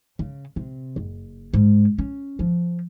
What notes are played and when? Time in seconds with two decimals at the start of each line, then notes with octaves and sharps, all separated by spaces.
0.19 C#3
0.56 C3
0.96 F#1
1.54 G#2
1.98 C#4
2.39 F3